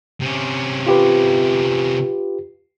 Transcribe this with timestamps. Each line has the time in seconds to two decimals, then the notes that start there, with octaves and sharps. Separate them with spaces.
0.21 C3 C#4
0.87 F4 G4 B4